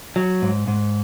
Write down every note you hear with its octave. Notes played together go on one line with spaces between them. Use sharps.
F#3
G#2
G#2